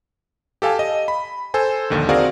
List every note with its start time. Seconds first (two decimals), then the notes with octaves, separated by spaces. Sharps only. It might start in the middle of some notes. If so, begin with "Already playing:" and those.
0.62 G4 A4 F5 G#5 A5
0.79 D#5
1.08 B5
1.54 A4 C5 G#5
1.90 A#1 D#2 D3 D#3
2.09 C4 F#4 G#4 A#4 D5 F5